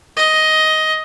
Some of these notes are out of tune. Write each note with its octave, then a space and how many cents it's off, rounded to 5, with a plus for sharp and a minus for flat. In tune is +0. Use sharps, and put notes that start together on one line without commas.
D#5 +10